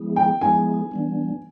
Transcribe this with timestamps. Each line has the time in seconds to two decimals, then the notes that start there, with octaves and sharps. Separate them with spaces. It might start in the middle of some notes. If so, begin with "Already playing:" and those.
Already playing: F3 G#3 B3 E4 G#4
0.16 G5
0.41 F3 G#3 B3 E4 G#4 G#5
0.91 E3 G3 B3 D4